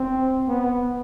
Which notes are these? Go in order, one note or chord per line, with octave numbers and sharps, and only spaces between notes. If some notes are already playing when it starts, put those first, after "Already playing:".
Already playing: C4
B3